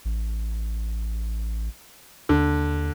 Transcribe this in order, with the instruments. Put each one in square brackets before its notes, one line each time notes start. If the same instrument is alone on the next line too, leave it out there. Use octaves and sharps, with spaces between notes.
[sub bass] A1
[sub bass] D#2 [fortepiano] D3